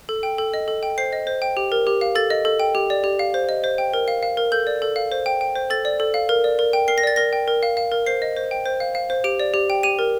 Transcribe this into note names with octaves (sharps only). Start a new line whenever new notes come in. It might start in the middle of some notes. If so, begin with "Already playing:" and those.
A4
G5
A4
D#5
A4
G5
C5 C7
D#5
C5
G5
G4
A#4
G4
F5
A4 A6
D#5
A4
G5
G4
D5
G4
F5
C5
D#5
C5
G5
A#4
F5
F5
A#4
A4 G6
D5
A4
F5
C5
G5
G5
C5
A4 A6
D5
A4
F5
A#4
D5
A#4
G5
A#4 C7
A#6
D5 A6
A#4 A#6
G5
A#4
F5
F5
A#4
C5 C7
D#5
C5
G5
C5
F5
F5
C5
G4 D7
D5
G4
G5
G4 D#7
A#4